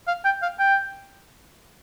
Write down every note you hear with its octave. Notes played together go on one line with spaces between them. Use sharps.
F5
G5
F5
G5